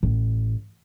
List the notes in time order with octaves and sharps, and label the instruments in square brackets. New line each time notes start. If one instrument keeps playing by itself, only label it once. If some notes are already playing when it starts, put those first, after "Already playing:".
[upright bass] A1